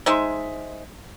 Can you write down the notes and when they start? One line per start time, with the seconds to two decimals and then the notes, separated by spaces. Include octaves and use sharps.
0.06 G#3 D#4 C5 E5